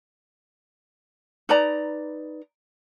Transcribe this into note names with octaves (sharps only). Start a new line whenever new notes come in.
D#4 B4 D5 A#5